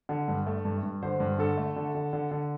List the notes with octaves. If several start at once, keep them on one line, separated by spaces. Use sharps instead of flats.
D3
G2
A3
G2
G2
D3 C5
G2
D3 A4
A3
D3
D3
D3
D3